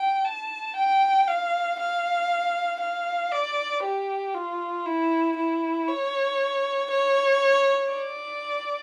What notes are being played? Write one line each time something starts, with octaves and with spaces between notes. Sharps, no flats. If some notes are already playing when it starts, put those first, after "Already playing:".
Already playing: G5
A5
G5
F5
F5
F5
D5
G4
F4
E4
E4
C#5
C#5
D5